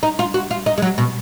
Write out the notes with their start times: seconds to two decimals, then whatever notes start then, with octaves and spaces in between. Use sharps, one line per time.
0.03 D#4
0.19 F4
0.34 F#4
0.51 F4
0.66 D#4
0.78 G#3
0.82 F#3
0.98 B2